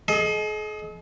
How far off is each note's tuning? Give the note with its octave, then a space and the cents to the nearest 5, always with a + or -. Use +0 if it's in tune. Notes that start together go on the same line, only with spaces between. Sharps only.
G#4 +45 D#5 +0